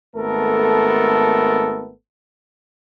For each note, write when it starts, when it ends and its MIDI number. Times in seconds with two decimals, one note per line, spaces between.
0.16 1.92 32
0.16 1.92 57
0.16 1.92 59
0.16 1.92 69
0.16 1.92 70